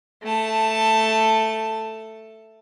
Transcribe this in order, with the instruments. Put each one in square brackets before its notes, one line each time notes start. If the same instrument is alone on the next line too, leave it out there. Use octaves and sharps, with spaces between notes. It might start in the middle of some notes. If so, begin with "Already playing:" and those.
[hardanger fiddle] A3 A5